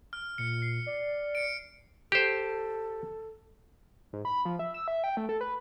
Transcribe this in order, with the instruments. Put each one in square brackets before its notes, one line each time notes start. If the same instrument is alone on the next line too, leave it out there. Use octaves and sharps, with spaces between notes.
[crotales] F6
[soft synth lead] A#2 [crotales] C#7
[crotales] C7
[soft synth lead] D5
[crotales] C#7 D7
[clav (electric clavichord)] G4 C5 [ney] A4
[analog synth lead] G#2
B5
F3
E5
E6
E5
G5
A3
A4
B4